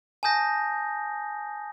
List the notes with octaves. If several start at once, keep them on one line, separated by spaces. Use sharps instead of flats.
G#5 A5 D#6 G6 A#6